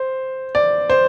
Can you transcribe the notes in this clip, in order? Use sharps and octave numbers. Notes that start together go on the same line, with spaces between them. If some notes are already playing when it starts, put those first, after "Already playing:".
Already playing: C5
D5
C5